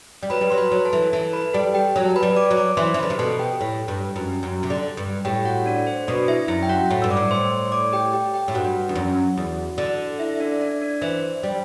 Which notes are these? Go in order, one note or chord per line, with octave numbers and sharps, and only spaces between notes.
G3
F#3 B4 B5
G3
F#3 C6
B4 B5
F#3
A4 A5
E3
E3 A4 A5
B4 B5
G3 A4 A5
G4 G5
F#3
A5
B4 B5
G3
D5 D6
F#3
D5 D6
E3 C5 C6
E3
D3 B4 B5
C3
B2 A4 A5
G4 G5
A2
G2
F#2
F#2
C3
D3
G2
A2 G4 G5
F#4 F#5
D4 D5
C5
B2 D4 D5
E4 E5
F#2 E4 E5
G5
F#4 F#5
A2
G2 E6
D5 D6
A2
C5 C6
D5 D6
G4 G5
G4 G5
G4 G5
A2
G2 F#4 F#5
E2
F#2
E2
D3
E4 E5
E5
D4 D5
D4 D5
D4 D5
E3 C5
G3